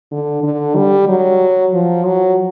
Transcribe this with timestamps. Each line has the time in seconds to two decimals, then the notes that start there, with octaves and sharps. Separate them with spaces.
0.11 D3
0.43 D3
0.76 G3
1.08 F#3
1.73 F3
2.06 F#3